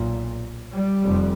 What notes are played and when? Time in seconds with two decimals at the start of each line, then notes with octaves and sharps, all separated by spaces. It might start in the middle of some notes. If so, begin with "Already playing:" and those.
Already playing: B1 A#2
0.73 G3
1.03 F1 F2